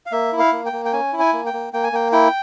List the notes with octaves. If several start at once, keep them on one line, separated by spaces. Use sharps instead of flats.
F5
A#3 E5
E4
F5
A#3
G5
A#3
G5
C#4 G#5
E4
G#5
A#3
G5
A#3
A#3 G5
G#5
A#3 G5
E4 G5